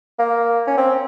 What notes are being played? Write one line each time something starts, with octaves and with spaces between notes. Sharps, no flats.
A#3
C#4
C4